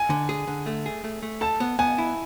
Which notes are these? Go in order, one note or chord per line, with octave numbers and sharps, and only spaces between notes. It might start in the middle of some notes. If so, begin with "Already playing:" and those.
Already playing: G#5
D3
G#4
D3
A3
G#4
A3
A3
A4 A5
B3
B3 G#5
E4